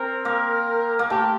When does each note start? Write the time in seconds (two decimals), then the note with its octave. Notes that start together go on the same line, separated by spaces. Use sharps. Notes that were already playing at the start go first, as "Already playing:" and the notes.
Already playing: C4 A#4
0.25 A#3
0.99 A#3
1.10 A3 G4